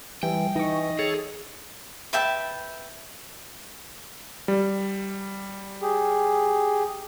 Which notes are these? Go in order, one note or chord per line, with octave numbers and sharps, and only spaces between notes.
E3 G3 G5
E3 D#4 D#5 C#6
G#4 A4 C#5
B4 E5 G5 A5
G3
G4 G#4